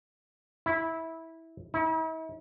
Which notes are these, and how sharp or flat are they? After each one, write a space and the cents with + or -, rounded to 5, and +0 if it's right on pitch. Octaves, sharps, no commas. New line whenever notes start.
E4 -15
E4 -45